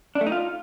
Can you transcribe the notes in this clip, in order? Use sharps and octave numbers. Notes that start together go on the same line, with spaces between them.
D4
A3
D#4
F4